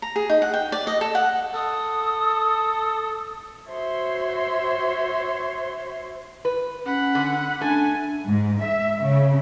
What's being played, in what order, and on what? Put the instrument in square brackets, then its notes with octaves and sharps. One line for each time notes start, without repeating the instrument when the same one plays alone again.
[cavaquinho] A#5
G#4
D#4
F#5
G5
D5
D#5
A4
F#5
[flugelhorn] A4 [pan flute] D#6
[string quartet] F#4 C5 C#5 E5 C6
[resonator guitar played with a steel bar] B4
[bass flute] C#4 [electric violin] F#5 B5
[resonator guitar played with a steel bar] D3
[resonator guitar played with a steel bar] A3 [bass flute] D4 [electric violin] G#5
[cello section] G#2
E5
C#3